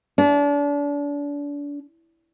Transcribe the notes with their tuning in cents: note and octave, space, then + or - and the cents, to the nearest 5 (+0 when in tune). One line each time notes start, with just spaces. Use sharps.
D4 -35